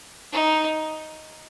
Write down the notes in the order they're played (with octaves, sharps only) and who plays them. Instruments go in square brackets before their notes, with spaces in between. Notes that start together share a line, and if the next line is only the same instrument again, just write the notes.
[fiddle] D#4